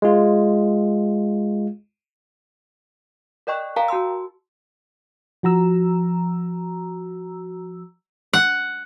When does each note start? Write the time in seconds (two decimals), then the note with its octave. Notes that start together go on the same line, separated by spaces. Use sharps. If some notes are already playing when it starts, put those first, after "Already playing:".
0.02 G#3 F4
3.47 A#4 D5 D#5 G5 C#6 F#6
3.76 A#4 F5 G5 A5 A#5
3.88 F#4 A5 C6 E6
5.43 F3 F#4 A#5 E6
8.33 F#5